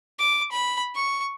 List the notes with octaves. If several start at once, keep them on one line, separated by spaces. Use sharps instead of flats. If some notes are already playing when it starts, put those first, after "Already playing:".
D6
B5
C#6